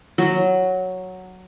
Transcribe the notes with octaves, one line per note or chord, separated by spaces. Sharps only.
F#3